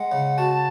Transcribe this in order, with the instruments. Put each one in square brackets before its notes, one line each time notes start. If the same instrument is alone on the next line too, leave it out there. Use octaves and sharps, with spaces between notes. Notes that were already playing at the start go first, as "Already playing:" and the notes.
Already playing: [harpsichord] G#3 [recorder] F#5
[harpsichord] C#3
[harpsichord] F#4 [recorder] A5